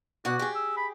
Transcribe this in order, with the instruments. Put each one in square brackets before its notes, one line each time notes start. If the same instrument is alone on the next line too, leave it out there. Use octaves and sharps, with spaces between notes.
[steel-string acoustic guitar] B2 D5 F#5 [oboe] F#4
[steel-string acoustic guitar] G4 G#4
[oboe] E6
B5